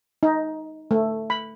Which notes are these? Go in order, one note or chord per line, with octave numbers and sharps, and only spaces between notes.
D#4
A3
B5